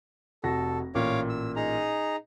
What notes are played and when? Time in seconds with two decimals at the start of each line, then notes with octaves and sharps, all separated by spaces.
0.44 F1 F#4 A4 A#6
0.95 A1 A#2 C#5 F5 D6
1.29 E6
1.56 D#4 G#4 A#5